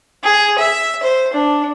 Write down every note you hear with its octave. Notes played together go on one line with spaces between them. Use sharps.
G#4
E5
C5
D4